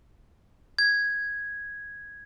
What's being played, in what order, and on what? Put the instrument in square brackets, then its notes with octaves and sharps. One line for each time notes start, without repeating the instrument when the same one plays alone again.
[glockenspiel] G#6